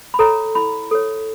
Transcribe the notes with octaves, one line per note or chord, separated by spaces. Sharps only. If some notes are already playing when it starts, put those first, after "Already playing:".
B5
A4 C#5 A#5
E4 B5
A4 C#5